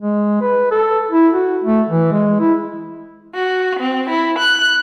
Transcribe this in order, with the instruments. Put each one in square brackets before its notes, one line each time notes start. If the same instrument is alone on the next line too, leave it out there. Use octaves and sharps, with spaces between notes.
[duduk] G#3
B4
A4
E4
F#4
A3
E3
G#3
E4
[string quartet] F#4
C4
E4
F#6